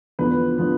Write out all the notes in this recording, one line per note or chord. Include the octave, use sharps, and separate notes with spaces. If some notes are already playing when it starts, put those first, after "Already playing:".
E2 D3 F3 B3 B4
D3 F3 B3